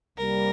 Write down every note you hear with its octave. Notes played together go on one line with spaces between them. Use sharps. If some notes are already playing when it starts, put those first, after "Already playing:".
C2 C3 G3 A#3 A#4